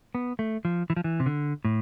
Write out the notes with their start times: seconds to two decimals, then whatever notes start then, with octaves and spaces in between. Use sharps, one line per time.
0.15 B3
0.39 A3
0.65 F3
0.90 E3
0.96 F3
1.04 E3
1.20 C3
1.26 D3
1.65 A2